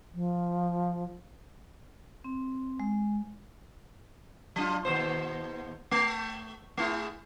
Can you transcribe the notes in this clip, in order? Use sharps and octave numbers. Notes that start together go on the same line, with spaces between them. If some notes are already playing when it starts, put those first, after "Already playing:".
F3
C4
G#3
F#3 D4 F4
D#2 B2 C5
A3
A3 E4 G#4